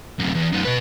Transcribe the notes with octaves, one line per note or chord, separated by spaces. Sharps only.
F#2 C3
E2
F#2 D#4
B2 B4